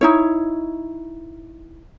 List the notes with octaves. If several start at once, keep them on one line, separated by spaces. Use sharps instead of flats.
D#4 E4 C#5